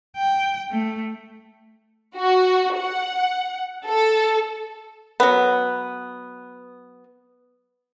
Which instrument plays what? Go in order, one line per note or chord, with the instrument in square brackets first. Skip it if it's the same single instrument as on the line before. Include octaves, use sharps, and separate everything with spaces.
[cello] G5
A3
[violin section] F#4
F#5
A4
[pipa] F#3 B3